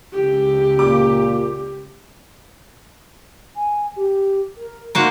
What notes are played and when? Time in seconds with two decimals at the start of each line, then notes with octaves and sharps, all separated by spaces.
0.13 C#2 G4
0.79 A#2 D6
3.56 G#5
3.96 G4
4.57 A#4
4.95 A#3 D#4 F#4 C5